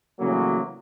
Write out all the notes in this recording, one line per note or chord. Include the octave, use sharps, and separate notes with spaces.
A2 C#3 E3 F#3 G3 A#3